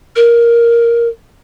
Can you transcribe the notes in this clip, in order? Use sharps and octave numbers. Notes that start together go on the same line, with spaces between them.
A#4